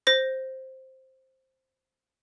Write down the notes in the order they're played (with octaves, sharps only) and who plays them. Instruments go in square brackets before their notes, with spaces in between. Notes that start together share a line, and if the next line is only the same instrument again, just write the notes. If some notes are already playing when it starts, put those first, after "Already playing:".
[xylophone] C5 A#6